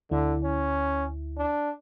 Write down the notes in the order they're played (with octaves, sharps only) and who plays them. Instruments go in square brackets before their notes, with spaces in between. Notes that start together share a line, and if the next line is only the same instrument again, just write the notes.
[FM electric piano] D2 E4 [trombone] D3
[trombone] C#4
D4